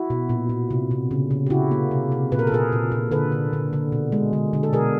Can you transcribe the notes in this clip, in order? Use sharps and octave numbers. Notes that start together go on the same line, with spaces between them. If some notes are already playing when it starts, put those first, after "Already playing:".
Already playing: E4 F#4
B2
A#2
A#2
C3
C3
C#3
C#3
G4
C#3 E4 F#4
A#3
C3
C3
A#2 B4
A#4
A4
A#2 G#4 A#4
A#2
A#2
D3 A4 B4
D3
D3
D3
B2
G#3
D3
D3
A4
B2 G#4 A#4